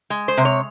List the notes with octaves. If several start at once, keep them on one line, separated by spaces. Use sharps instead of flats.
G#3
C5
C3
C#5